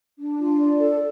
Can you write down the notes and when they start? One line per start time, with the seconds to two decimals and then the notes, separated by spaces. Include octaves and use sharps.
0.18 D4
0.39 F4
0.59 D5
0.80 A4